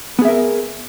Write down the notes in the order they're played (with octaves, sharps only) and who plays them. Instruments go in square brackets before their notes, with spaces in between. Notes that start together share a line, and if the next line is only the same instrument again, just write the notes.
[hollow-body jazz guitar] B3
G#4
E5
A#4